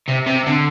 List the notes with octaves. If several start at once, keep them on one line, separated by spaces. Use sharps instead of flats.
C3
C3
D3